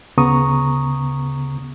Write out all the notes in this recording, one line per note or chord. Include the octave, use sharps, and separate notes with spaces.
D2 C#3 B3 A#5 C#6 D#6